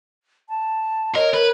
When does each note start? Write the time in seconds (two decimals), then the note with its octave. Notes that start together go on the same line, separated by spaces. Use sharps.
0.49 A5
1.15 A#4 C#5 D#5
1.34 A#4 B4